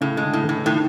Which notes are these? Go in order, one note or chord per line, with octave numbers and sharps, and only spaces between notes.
A2 C#3
G#3
D3
A2
E3
A2
A2 D#3